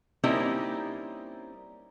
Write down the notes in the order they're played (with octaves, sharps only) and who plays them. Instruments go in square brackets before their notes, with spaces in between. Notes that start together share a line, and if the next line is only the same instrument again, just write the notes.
[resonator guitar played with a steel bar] G3 A#3 C4 C#4 D#4 E4